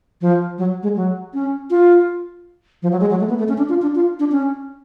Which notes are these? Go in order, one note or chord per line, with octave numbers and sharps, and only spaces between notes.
F3
F#3
G#3
F#3
C#4
F4
F3
F#3
G#3
F#3
A3
B3
A3
C#4
D4
F4
D4
F4
D4
C#4